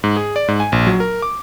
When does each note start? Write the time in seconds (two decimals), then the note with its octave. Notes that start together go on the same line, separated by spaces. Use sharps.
0.04 G#2
0.17 G#4
0.36 D5
0.48 G#2
0.60 G#5
0.72 A#1
0.87 F#3
1.00 A#4
1.22 D6